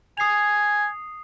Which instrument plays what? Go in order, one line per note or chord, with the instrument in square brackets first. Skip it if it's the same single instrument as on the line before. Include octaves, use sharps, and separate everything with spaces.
[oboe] G#5 [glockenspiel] D#6 C7 F7